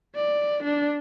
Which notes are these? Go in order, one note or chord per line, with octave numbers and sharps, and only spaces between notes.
D5
D4